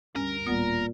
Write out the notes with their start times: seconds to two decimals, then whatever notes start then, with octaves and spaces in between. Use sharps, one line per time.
0.16 D2 G2 C#4 A#4
0.47 D1 A#2 G3 B3